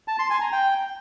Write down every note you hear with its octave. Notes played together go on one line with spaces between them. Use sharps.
A5
C6
G#5
A#5
G5